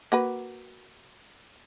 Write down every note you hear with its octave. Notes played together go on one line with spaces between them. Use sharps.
A#3 F#4 B4